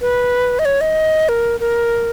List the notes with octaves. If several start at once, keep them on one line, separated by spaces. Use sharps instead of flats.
B4
D#5
C#5
D#5
A#4
A#4